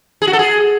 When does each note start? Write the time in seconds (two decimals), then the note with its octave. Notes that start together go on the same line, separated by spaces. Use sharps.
0.22 G#4
0.27 F#4
0.33 A4
0.39 G#4